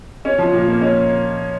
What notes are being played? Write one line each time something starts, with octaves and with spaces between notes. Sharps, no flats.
C#4
F3
A#2
A#3
C#4